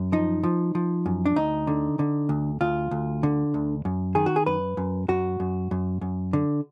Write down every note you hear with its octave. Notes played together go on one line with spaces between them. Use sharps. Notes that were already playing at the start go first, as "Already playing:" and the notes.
Already playing: F#2
F3 D#4
F3
F3
F#2
D4
D2 D#4
D3
D3
D2
D2 F4
D2
D3
D2
F#2
D#3 G#4
F#4
G#4
F#2 B4
F#2
F#2 F#4
F#2
F#2
F#2
D3